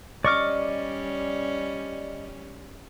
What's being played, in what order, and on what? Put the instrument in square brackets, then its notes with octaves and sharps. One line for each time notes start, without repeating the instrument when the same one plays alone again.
[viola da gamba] G3 C#4 [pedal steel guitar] D5 D#5 F6 [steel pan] C#6 D6